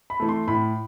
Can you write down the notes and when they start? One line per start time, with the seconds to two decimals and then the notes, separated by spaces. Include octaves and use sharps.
0.10 B5
0.20 E3 A3
0.29 C6
0.47 A2 B5